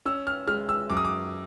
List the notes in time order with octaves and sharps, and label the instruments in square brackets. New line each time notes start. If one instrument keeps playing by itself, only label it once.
[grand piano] C#4 E6
F6
G#3 F6
E6
F#2 D6
D#6
D6